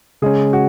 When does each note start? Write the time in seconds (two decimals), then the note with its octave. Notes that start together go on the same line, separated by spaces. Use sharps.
0.22 C#3 G#3 C#4 G#4
0.53 F#4